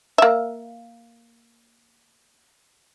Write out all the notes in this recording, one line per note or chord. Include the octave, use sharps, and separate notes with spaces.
A#3 E5